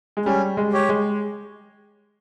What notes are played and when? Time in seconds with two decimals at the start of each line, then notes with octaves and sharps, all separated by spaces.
0.17 G#3
0.26 G3 C#4
0.57 G#3
0.73 G4 C#5
0.89 G#3